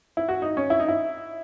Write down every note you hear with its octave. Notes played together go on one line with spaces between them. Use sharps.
E4
F#4
D#4
C#4
E4
D#4
E4